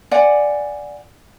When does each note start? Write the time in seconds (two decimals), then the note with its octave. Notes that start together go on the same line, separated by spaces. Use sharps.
0.11 D5 F#5 G#5